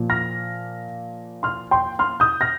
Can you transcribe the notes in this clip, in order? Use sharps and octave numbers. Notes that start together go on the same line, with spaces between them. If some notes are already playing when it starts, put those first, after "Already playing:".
Already playing: A#2 F3 A#3
F6 A#6
C6 F6
G5 C6
C6 F6
D#6 G6
F6 A#6